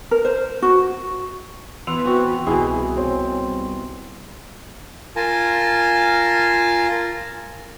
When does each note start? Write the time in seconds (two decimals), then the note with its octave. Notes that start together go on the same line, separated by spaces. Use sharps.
0.11 A#4
0.25 C5
0.62 F#4
1.87 E3 B3 B4 F#5 C6 E6 F7
2.05 C4 F#4
2.47 C2 B2 E3 E4 G#4
2.97 C4 C#5
5.16 F4 A#4 G#5 A5